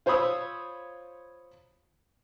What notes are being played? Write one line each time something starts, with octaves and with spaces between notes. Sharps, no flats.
F4 C5 C#5 B5 D#6 E6